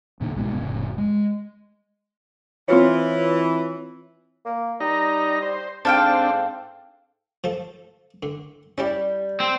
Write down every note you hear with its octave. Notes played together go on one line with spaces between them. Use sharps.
E1 A#2 D3 D#3
C2 G#2 B2
F1 A2 C#3
G#3
E3 C4 F4 C#5
A#3
G3 D#4 A#5
C5
G#2 C4 D4 A4 F5 G5
F3 A4
D3
G3 C#4 E4 G4
C4